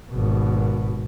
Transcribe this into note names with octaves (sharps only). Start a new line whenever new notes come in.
G#1 B2